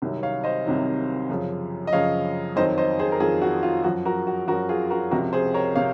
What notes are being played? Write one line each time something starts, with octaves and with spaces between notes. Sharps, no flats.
C2 C3 D#3 F#3
C#5 F5
C5 D#5
C2 C3 D#3 F#3
F#2 C#3 F3
D#5
F#2 C#3 F3 C#5 F5
F2 D#3 F#3 C5 D#5
C5 D#5
G#4 C5
A#4
F2 D#3 F#3 F4 G#4
F#4
F4
F#2 F3 F#4
F#4 A#4
F#4
F#2 F3 F#4 A#4
F4 G#4
F#4 A#4
C#2 C3 F3 F#4 A#4
G#4 C5
A#4 C#5
C3 C#5 F5